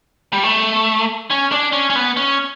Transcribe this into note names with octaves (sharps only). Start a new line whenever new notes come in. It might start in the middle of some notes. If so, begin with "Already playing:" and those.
G3
A3
C#4
D4
C#4
C#4
B3
C#4